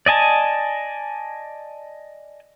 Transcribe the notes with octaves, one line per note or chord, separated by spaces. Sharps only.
D5 D#5 G#5 A5